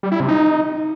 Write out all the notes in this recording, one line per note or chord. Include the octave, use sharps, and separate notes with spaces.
G3
E4
C3
D#4